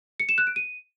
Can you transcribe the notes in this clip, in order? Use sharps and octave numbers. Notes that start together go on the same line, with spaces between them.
C#7
E7
F#6
D7
D#7